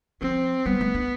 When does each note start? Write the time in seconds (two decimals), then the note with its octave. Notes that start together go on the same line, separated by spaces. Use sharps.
0.21 F3 C4
0.66 G3 B3
0.81 A3
0.94 D4